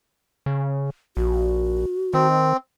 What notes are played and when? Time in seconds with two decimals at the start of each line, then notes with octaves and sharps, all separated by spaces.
0.46 C#3
1.17 A#1 F#4
2.13 D#3 C4